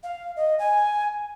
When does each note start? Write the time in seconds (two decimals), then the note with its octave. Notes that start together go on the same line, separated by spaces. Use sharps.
0.03 F5
0.36 D#5
0.59 G#5